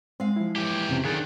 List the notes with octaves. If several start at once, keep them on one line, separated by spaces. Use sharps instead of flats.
G#3 C4 F5
F3 E4
E3 G4
F2 C3 C#4
D3 D#3 G#4 F#6 A6